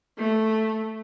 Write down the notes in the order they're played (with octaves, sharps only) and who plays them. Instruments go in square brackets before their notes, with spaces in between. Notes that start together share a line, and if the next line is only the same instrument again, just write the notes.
[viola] A3